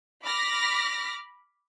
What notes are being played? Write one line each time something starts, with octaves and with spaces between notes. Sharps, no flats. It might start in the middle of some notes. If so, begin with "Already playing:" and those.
B5 D6 F6 A#6 B6